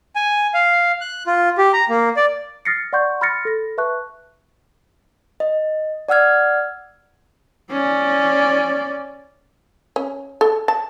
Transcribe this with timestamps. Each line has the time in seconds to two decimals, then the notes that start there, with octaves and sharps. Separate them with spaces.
0.16 G#5
0.54 F5
1.01 F#6
1.27 F4
1.58 G4
1.73 A#5
1.89 A#3
2.17 D5
2.65 D#6 F6 A6 A#6 C7 C#7
2.93 D5 F#5 C6 C#6 G6
3.21 B5 C6 F6 A6 A#6 C#7
3.45 A4 A#6
3.78 B4 E5 A5 C#6 F#6
5.40 D#5
6.08 D5 F#5 E6 F6 G#6
7.71 C#4 D5
9.96 C#4
10.41 A4
10.68 A5